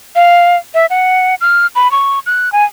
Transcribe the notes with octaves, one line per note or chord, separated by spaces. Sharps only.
F5
E5
F#5
F6
B5
C#6
F#6
G#5